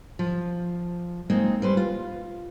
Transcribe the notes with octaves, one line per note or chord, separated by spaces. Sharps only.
F3
G#3 A#3 C4 D#4
G3 B4 C5
F4